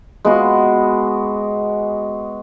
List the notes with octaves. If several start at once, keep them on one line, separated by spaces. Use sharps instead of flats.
G#3 B3 F#4